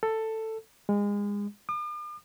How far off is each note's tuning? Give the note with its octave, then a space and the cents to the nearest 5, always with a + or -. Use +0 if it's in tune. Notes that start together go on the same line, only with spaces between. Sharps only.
A4 +10
G#3 -30
D6 +45